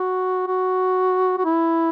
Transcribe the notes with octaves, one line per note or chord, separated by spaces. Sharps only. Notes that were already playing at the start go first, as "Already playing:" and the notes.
Already playing: F#4
F#4
F#4
E4